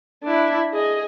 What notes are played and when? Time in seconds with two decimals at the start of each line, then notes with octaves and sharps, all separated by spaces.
0.24 D4 E4
0.73 G#4 D#5